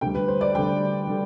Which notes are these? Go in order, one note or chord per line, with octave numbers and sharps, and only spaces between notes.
D2 D3 G3 G5
B4
C5
D5
D2 D3 G3 G5
D3 G3